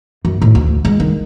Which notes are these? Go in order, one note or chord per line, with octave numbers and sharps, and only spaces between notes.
F#2
A2
D2
G#3
D#3